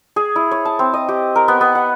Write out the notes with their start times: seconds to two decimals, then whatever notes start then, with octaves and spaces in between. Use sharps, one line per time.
0.16 G#4
0.36 E4
0.51 C#5
0.65 A5
0.79 C4
0.94 D#5
1.09 G4
1.36 A#4
1.48 B3
1.61 B3
1.75 F#5